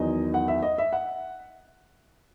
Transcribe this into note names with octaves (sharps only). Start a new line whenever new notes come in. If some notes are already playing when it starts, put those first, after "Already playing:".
Already playing: E2 D#3 F#3 B3 D#4 D#5
F#5
E5
D#5
E5
F#5